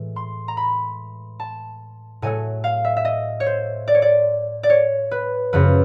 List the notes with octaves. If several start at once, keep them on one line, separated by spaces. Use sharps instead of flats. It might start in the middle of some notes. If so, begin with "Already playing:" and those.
Already playing: A2 E3 G#3
C6
A#5
B5
A5
A2 F#3 A3 G#5
F5
E5
E5
D#5
C#5
C5
D5
C#5
D5
D5
C#5
B4
F#2 C#3 F3 B4